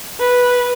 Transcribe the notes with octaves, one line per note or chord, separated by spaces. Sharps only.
B4